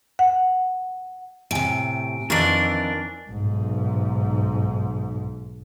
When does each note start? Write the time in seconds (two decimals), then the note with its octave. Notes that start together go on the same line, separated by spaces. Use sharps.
0.19 F#5
1.51 A2 C3 G#5 D7
2.30 F2 D#3 E3 D4 A#4 A6
3.30 B1 G#2